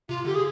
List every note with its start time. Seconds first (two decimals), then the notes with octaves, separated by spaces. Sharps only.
0.09 C3 F4
0.25 D3 G4
0.35 G#4